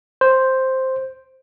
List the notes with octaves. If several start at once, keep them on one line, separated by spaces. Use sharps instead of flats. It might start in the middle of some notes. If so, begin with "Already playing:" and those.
C5